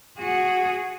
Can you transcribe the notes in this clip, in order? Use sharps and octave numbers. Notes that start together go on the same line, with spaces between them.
F#4 G#4